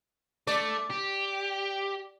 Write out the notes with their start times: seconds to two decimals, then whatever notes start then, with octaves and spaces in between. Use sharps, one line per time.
0.47 A3 D5
0.90 G4